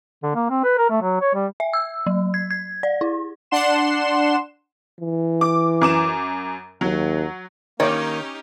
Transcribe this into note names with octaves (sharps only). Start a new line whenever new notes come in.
D3
A#3
C4
B4
A#4
A3
F#3
C#5
G3
E5
E6
F#3
G#6
G#6
D5
E4
D4 F#5 C6 E7
E3
D6
F#2 D6 E7
D#2 F#3
D#3 A#3 C#4 D#4 G4 C#5 D6